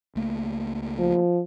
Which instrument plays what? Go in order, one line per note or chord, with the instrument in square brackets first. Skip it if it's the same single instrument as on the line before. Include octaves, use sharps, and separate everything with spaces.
[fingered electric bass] C#2 A3 A#3
[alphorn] F3